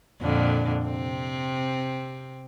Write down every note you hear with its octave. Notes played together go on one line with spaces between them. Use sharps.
F2 A#2 D3
C3 C4